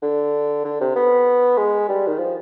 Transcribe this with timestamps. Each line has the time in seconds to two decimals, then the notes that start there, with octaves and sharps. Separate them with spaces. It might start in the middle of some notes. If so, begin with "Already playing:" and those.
0.03 D3
0.65 D3
0.81 C3
0.96 B3
1.58 G#3
1.89 G3
2.07 D#3
2.19 F3